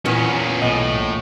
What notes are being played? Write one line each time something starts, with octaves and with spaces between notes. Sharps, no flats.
E2 A#2 E3 B3 C#4
B1 A2 B3 D#5